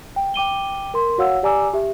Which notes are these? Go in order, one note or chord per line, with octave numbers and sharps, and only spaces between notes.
G5
G5 D6 D#7 G7
A#4 C6
F#4 C#5 F5 F#5 E6
G4 D5 G#5 A#5 D6 E6
G4 E5